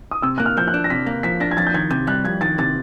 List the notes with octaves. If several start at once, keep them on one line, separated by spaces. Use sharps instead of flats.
D#6
C3 E6
A#3 F#6
F6
F3 G6
F#6
D4
A#6
C3 B6
A#3
F3 B6
D4 A#6
G#6
F2 A6
G6
D#3 G#6
C3 G6
G3 F#6
F2 G#6
D#3 A6
C3 A6